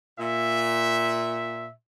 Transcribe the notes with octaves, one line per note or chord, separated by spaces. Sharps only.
A#2 E5